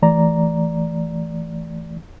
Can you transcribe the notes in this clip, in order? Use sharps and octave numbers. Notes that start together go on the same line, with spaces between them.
E3 A3 D5 A#5